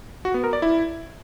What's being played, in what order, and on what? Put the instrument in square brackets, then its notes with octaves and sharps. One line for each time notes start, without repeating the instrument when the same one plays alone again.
[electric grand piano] F#4
B3
A#4
D5
E4